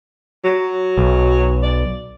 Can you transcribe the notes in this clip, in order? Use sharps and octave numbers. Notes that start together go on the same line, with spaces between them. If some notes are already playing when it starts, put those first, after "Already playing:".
F#3
B1
D5